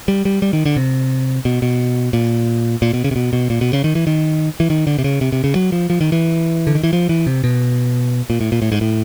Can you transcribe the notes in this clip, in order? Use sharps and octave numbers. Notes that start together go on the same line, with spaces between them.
G3
G3
G3
D#3
D3
C3
B2
B2
A#2
A#2
B2
C#3
C3
B2
B2
A#2
B2
C#3
D#3
E3
D#3
E3
D#3
D3
C3
C#3
C3
C3
C#3
F#3
F3
F3
D#3
E3
D3
D#3
E3
F3
E3
C3
B2
A#2
A2
A#2
A2
G#2
A2